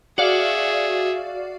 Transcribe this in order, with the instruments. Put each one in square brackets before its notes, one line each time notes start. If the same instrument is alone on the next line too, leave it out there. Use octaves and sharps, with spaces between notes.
[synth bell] F#4 D5 F5 [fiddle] G#4 E5